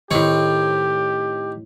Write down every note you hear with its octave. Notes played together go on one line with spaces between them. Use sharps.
A2 D#3 C4 G4 C#5